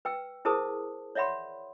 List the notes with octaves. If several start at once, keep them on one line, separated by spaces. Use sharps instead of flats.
B4 G5 E6
E4 G#4 A#4 C5 A5 D#6
C#5 D5 E5 F#5 B5 C6